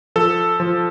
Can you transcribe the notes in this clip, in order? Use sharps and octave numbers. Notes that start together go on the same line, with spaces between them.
F3 A4
F3